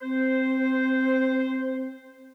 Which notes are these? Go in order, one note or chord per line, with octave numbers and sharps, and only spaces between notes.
C4 C5